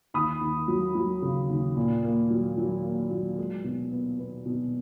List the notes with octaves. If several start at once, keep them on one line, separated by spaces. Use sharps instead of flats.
D#2 B5 D#6
D#2
F#3
F#3
C#3
D#2
A#2
A#3
F#3
F#3
A#3
F#3
G#3
B2
B3
B3
B2